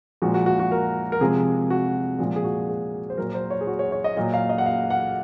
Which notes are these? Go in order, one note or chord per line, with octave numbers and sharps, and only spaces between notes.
A#2 F3 G#3 F#4
F#4
F#4
F#4
A#4
A#4
C3 F3 G#3 G#4
F#4
A#2 F3 G#3
G#4
F#4
G#4
C5
A#2 F#3 A#4
C5
C#5
G#4
F#4
C#5
C#5
D#5
A#2 F#3 D#5
F5
D#5
F#5
F5
F#5